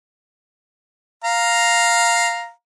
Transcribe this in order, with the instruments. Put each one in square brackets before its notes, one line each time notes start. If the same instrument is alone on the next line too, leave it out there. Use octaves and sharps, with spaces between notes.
[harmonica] F5 A#5